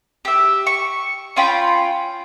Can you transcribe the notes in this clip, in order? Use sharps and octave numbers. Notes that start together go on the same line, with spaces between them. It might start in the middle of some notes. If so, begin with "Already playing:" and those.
G4 E5
C#6
C#4 F4 G5 B5